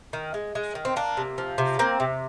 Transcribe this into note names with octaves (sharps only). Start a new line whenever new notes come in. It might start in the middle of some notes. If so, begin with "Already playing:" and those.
D#3
G#3
G#3
D#3
C4
A#3 D4
C3
F3
C3
A#3 C4
C3